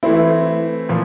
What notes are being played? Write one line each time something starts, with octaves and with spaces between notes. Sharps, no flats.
E3 A3 C4 E4
A#2 F3